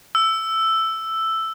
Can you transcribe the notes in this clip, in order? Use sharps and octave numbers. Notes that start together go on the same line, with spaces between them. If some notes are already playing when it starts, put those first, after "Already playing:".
E6